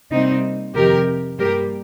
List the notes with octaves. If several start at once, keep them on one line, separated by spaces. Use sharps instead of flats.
C3 G3 A#3 C4 D#4
F2 C3 D#3 G4 A#4
G2 G3 A#3 G4 A#4